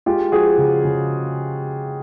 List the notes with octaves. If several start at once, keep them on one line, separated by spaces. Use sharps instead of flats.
G#3 F4 G4
F3 F#4 G#4
C#3
C#3